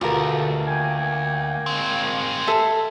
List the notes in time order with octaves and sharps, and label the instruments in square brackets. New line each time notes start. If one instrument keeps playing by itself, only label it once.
[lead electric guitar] D2 [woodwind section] G2 B2 D3 [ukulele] F4 A#4
[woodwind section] A#3 G5 G#5
[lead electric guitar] G#3 C4
[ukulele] A4 E5